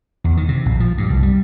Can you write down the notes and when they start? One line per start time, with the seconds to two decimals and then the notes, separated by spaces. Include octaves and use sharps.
0.24 E2
0.37 D#3
0.48 C3
0.66 A#1
0.80 F3
0.98 G2
1.10 C2
1.23 G3